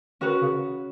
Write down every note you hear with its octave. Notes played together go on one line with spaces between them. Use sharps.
D#3 C#4 F#4 B4
C#3